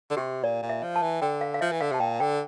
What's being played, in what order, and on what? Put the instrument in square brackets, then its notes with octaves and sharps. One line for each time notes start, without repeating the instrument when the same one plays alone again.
[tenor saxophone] D3
[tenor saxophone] C3 [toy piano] G4
[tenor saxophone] A#2 [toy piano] D5
[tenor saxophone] A#2
[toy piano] E5
[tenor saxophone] F3
[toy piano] A5
[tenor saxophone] E3
[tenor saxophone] D3 [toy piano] G5
[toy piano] F5
F5
[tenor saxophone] F3 [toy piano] E5
[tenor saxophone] E3
[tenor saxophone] D3 [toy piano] F5
[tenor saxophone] C3 [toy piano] A5
[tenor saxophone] A#2 [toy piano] G5
[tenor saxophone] D3 [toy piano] G5